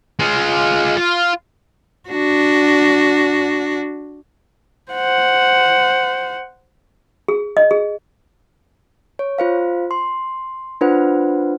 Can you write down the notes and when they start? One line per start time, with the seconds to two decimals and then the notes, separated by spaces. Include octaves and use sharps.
0.19 G#3 F4
0.97 F4
2.09 D4 F#4
4.92 C5 F#5
7.28 G#4
7.57 D#5
7.71 G#4
9.19 C#5
9.38 F4 C5 F5
9.91 C6
10.81 D4 F4 B4 C5 F#5